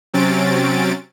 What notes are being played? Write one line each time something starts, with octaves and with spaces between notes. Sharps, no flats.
C3 F#3 C4 C#4 A6 D7